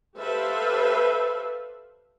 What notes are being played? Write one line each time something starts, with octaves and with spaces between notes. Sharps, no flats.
G4 A4 B4 C5 E5 F5